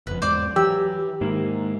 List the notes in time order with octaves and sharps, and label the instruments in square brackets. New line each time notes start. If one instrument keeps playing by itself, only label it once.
[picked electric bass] F#1 F2 [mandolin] B4
[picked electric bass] E2 G#2 [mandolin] C5 D5 D6
[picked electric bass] E3 [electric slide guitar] F#3 [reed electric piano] G4 [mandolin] E6
[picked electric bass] G#2 [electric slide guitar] D#3 A#3 E4